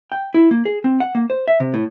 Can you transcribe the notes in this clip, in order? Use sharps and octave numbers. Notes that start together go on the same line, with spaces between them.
G5
E4
A#3
G#4
C4
F#5
A#3
C5
E5
C3
A2